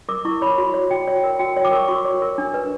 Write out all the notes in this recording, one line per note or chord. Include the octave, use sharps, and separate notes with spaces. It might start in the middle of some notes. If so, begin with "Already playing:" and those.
A#4 D6
E4 C#6
C#5 B5
F#4
C#5
F#4 G5
C#5
A#4
F#4 G5
C#5
D6
A#4 C#6
F#4 C#6
C#5
A#4
D4
B4